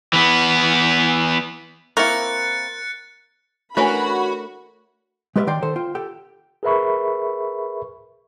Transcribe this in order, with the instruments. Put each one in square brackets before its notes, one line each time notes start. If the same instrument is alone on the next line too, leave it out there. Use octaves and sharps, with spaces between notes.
[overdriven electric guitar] E3 B3
[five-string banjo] A#3 C4 E4 [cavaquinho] A#4 C#6 [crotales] F#6 A6 C#7
[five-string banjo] E3 C#4 B4 [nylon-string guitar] A3 D4 A#4 [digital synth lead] F#4 [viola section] B5
[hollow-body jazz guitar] G#3 G4 B4 D5 E5 F5
D#3 D5 G5 A#5 C6
D#3 A4 C5
F4 G5
G4 A4 G5
[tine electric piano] G#4 A#4 B4 E5 B5 C#6